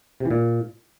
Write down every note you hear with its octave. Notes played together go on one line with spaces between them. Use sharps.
C3
E3
A#2